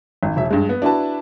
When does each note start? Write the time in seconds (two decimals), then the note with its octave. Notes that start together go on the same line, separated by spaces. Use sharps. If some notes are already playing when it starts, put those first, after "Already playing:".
0.23 G#1
0.36 E1 E5
0.50 G2 G#3
0.69 B3
0.82 D4 E4 F#4 B4 A5